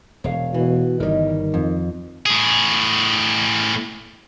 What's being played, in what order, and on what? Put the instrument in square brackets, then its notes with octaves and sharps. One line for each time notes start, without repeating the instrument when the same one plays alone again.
[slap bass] E1 [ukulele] C#5 F5
[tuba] B2 [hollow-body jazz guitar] E3
[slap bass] G1 G3 [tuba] D#3 [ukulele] A#4 C#5 D#5
[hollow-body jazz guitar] F2
[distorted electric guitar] A2 G#4